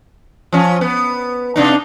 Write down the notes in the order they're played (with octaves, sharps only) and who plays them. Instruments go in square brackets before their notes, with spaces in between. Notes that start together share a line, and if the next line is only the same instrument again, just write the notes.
[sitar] F3 C#4
B3
C3 D4 D#4